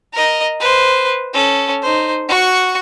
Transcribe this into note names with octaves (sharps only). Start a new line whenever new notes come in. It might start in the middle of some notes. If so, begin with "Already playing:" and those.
A#4 D#5
B4 C5
C#4 A4
D#4 C5
F#4 C#6